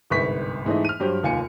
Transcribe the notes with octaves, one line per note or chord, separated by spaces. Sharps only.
G1 C2 G#2 B4 C#6 B6
G#2 E3 A3 D#4
F6 D#7
G2 F#3 G4 C5
F1 D#2 F4 G#5 C#7